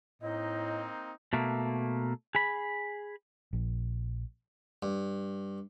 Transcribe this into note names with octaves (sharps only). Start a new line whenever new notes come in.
A2 A#3 C4 D#4 D#5
B2 A3 A#3
G#4 B5
A#1
G2